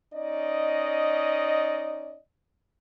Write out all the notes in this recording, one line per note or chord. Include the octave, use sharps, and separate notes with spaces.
C#4 D#4 D5 D#5